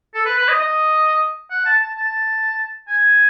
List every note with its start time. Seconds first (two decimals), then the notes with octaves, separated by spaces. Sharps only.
0.15 A4
0.25 B4
0.37 B4
0.48 D#5
0.59 D#5
1.51 F#5
1.66 A5
1.81 A5
1.97 A5
2.88 G#5